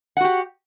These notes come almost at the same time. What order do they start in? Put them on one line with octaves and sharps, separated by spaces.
F#5 F#4 G4